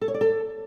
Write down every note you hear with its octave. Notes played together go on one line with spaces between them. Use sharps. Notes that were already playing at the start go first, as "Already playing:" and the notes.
A4
C#5
D5
A4